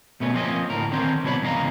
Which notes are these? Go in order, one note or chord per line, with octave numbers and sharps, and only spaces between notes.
B2 A3 B3 C#4
F3 A#3 C4 C#4 C5 D#5
D2 A2 A#4
D3 D#3 C4 C#4 A#4 C5
C2 B2 D4 C#5 B5
E2 G#2 C#3 D#4 F5 A#5